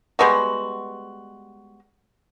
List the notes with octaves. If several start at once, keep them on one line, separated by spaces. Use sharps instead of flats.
G3 G#3 B3 F#4